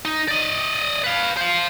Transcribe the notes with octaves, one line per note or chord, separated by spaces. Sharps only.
D#4
D5 D#5
B4 F5
C5 F5